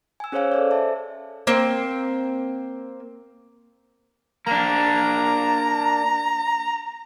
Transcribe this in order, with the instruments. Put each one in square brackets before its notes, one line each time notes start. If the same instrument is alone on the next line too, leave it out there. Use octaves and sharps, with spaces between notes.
[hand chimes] G#5 E6
C#4 G#4 C5 C#5 F5 G#5
A4 C5 D5
E5 A5
[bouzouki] A#3 C4
[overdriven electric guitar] A#3 D4 [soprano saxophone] A#5